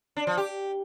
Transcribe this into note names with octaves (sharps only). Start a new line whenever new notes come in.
D4
F3
G4